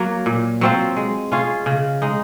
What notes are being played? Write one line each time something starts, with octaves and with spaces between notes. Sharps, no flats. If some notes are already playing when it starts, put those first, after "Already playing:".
Already playing: F#3 A#3
A#2
F#3 C4 F4
G#3
C#4 F4 G#4
C#3
G#3 D#4